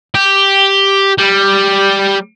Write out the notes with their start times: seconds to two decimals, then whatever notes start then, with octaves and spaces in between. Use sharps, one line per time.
0.15 G4
1.18 G3